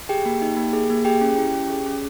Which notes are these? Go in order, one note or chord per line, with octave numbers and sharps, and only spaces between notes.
G4 G#4 G5
A#3
D#4
A#3
G#4
A#3
G4 G#4 G5
C#4
E4
C#4
G#4
C#4